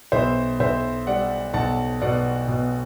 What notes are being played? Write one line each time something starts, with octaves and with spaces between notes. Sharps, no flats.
B1 C5 E5
B1 C5 E5
G3 D5 F#5
B1 F#5 A5
B2 D5 F#5
B2